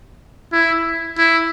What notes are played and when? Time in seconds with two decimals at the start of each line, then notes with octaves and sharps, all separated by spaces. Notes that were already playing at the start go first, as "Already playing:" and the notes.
0.52 E4
1.18 E4